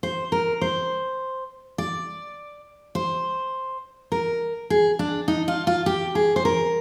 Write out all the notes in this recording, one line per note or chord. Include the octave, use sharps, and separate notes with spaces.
C5
A#4
C5
D5
C5
A#4
G#4
D4
D#4
F4
F4
G4
G#4
C5
A#4